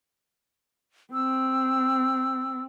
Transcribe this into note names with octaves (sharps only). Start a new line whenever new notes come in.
C4 E6